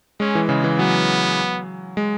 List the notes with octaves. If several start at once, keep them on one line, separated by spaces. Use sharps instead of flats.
G#3 C#4
E3
C#3 G#3
E3
F#3 B3
G#3